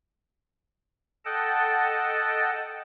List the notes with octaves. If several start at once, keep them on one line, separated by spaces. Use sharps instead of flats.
A4 D#5 F#5 G5 A5